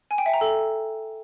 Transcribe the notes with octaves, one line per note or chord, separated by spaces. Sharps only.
G#5
G5
E5
A#5
A4